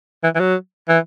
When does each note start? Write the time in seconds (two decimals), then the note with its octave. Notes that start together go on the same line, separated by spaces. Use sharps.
0.23 E3
0.35 E3
0.40 F#3
0.88 E3